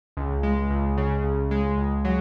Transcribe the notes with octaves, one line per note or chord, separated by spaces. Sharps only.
C#2
G#3
C#2
C#3
C#2
G#3
C#2
F#3